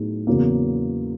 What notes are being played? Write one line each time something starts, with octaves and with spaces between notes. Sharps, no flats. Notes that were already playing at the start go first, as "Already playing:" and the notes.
Already playing: A2 F#3 B3 D#4 G#4
E2 C#3 F#3 A#3